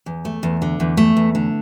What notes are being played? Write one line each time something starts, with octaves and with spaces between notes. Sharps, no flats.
E2
A3
E2
D3
E2
A3
E2
D3